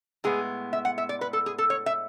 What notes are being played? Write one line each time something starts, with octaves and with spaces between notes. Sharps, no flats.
A2 G#3 B3 G#4
E5
F#5
E5
D5
B4
A4
G#4
A4
C#5
E5